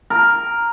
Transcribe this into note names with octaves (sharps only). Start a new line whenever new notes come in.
A#4